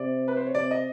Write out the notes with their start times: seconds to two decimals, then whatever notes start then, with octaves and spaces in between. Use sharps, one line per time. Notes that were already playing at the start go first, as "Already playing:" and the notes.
Already playing: C3 D5
0.28 B4
0.37 C5
0.47 C#5
0.55 C3 D5
0.71 D#5